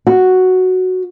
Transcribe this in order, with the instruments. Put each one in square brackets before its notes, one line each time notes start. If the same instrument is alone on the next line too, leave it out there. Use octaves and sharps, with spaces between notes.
[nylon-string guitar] F#4